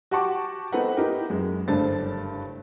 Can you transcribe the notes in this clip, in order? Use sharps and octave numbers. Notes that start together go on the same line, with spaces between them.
F#4 G4 F#5 A5 C#6 D6
B3 C4 D#4 A4 B4 F#5
D#4 E4 G4 A#4
F#2 G#3
F#1 G2 D3 A3 C5 A6